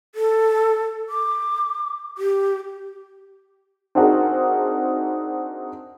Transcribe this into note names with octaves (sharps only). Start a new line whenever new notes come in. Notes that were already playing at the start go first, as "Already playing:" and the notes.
A4
D6
G4
C4 D4 D#4 F#4 G#4 A#4